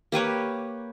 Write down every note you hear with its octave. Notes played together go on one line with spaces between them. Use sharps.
A#3 G4 B4 C#5